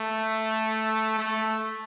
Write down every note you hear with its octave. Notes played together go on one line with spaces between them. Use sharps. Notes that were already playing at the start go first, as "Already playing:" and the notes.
Already playing: A3
A3